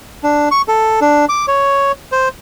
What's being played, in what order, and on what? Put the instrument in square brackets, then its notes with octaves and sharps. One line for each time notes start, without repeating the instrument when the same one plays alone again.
[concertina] D4
C#6
A4
D4
D6
C#5
C5